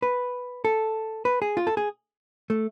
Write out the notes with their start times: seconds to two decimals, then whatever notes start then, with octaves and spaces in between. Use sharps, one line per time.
0.02 B4
0.65 A4
1.25 B4
1.42 G#4
1.57 F4
1.67 A4
1.77 G#4
2.50 A3